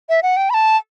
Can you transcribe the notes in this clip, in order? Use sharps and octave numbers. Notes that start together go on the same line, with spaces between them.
E5
F#5
G5
B5
A5